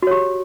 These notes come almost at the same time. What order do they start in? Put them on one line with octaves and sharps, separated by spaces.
F#4 C#5 G4